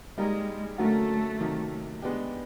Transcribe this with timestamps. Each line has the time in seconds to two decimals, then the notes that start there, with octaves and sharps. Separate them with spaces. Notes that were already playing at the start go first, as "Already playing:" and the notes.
0.17 G3 G#3 A#3 D#4 G4 A#4
0.78 D3 F#3 A3 A#3 C#4 F#4
1.40 C3 D#3 F#3 A#3
2.02 G#3 B3 D4 G4